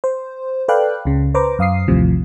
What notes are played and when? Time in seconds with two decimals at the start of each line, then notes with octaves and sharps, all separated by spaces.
0.04 C5
0.68 A4 B4 D5 F5 G5 F#6
1.05 C#2 C#3
1.34 B4 C5 A#5 D6
1.59 F#2 F5 D#6 C7
1.88 A1 D#2 A2 C3 F3